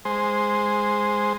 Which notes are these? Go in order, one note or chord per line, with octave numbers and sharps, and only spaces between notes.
G#3 C5